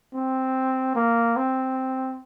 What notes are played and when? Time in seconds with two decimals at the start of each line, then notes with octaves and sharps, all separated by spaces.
0.14 C4
0.95 A#3
1.36 C4